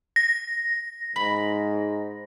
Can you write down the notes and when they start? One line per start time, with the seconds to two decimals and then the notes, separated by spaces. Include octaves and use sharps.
0.16 A#6
1.16 G#2 B5